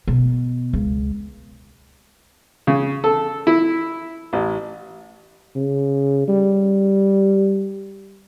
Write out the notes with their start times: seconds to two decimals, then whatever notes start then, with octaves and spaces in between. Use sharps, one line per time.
0.08 B2
0.73 C#2
2.67 C#3
3.04 A4
3.47 E4
4.33 A1
5.56 C#3
6.28 G3